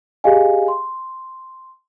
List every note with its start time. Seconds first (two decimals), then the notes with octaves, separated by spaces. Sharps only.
0.24 G4 G#4 D#5 F5 G#5
0.68 C6